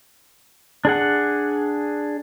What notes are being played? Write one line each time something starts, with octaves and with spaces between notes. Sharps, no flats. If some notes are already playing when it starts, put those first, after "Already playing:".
D4 G#4 F#5